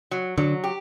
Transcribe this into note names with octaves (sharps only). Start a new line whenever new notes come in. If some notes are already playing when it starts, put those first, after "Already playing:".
F#3
D3 F#3
G4